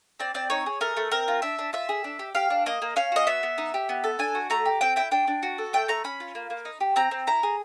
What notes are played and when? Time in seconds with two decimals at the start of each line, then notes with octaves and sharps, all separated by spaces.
0.20 C4 D5
0.34 C4 D5
0.50 D#4 C#5
0.66 G#4
0.81 A3 A#4
0.97 A3
1.12 C4 A#4
1.28 F4
1.42 D4 E5
1.59 D4
1.73 F4 E5
1.89 G#4
2.04 D4
2.19 G4
2.35 G4 F5
2.50 D4
2.66 A#3 D#5
2.82 A#3
2.96 C#4 F5
3.12 F#4 D#5
3.27 B3 E5
3.43 B3
3.58 D#4
3.74 G4
3.89 B3
4.04 A4
4.19 D4 G#5
4.35 F#4
4.50 A3 A#5
4.65 G4
4.81 C4 G5
4.96 E4 G5
5.11 D4 G5
5.28 D4
5.43 F#4
5.58 A4
5.73 A3 G5
5.88 A3 A#5
6.04 C#4 B5
6.20 F4
6.35 A#3
6.50 A#3
6.65 D#4
6.81 G4
6.96 C4 A#5
7.11 C4
7.27 E4 A#5
7.43 G#4